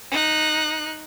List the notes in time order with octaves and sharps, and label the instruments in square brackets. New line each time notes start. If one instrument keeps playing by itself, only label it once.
[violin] D#4 F#6